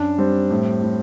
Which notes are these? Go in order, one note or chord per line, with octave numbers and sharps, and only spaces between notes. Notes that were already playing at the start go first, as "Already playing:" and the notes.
Already playing: F#2 D4
G3 C4
A2
A2